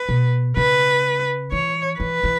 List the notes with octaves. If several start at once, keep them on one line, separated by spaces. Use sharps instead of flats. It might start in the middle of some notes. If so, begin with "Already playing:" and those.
Already playing: B4
B2
C#3 B4
E3 C#5
E3 B4
E3